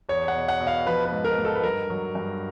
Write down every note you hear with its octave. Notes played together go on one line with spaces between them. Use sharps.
E2 C#5
F#5
B2
F#5
B2
F5
F3 B4
B4
G#2
A#4
G#2
A4
B4
G2 A#4
F#3
G2